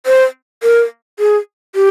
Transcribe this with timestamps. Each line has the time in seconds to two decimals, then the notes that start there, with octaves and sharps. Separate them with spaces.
0.06 C5
0.63 A#4
1.19 G#4
1.75 G4